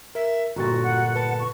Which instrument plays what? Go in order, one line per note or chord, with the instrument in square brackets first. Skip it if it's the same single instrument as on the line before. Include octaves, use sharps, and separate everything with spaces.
[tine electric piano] A#4 [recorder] E5
[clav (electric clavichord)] G1 A#2 [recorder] F#4 [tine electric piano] A#5 C#6 A6
[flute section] F#5
[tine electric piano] B4 [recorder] A5
[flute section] C#6